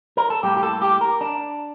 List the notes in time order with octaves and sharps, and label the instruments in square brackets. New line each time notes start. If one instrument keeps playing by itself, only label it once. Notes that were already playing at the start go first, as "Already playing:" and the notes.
[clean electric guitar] A#4
A4
A2 G3 A#3 G4
G4
A4
G4
A#4
D4